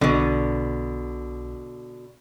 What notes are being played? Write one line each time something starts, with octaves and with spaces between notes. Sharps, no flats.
B1 B2 D3